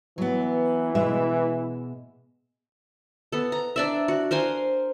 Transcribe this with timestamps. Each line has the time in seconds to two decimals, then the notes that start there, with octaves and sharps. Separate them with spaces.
0.18 E3 F#3 B3
0.95 B2 G#3 E5
3.32 B3 A4
3.52 A#5
3.76 D4 D5 E5
4.08 F#4
4.31 A#4 C5 F5 G#5